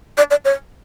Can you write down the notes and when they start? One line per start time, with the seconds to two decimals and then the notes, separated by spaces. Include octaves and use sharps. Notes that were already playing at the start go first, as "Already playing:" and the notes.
0.18 D5
0.31 D5
0.45 C#5